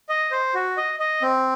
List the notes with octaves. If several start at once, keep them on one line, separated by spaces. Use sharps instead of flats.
D#5
C5
F#4
D#5
D#5
C4